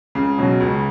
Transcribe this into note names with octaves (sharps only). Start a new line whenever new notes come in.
C#2 C#3
B2 F#3 C#4 F#4
C#2